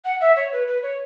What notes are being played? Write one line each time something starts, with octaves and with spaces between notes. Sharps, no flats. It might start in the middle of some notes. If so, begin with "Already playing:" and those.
F#5
E5
C#5
B4
B4
C#5